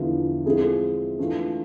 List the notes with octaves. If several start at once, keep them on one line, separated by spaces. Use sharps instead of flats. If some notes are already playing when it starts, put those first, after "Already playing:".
Already playing: E2 D3 F3 B3 E4
F3 G#3 C4 E4 G#4
E3 A3 D4 F4